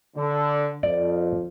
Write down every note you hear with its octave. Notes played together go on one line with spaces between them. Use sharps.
D3
F2 D5